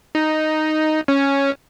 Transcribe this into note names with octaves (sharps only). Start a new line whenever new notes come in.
D#4
C#4